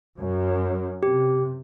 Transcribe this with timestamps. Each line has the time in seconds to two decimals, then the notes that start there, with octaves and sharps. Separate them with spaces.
0.18 F#2
1.03 C3 G4